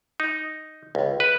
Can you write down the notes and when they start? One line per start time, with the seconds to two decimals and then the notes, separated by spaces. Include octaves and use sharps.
0.20 D#4
0.95 C#2
1.20 B4